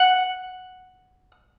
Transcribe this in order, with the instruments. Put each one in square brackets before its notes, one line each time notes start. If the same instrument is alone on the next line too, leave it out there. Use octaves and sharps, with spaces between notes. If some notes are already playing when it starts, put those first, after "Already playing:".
Already playing: [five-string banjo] F#5